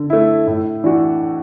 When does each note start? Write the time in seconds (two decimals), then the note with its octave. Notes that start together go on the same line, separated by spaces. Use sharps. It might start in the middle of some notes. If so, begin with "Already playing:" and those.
Already playing: D3
0.10 A3 E4
0.47 A2
0.84 E3 D4 F#4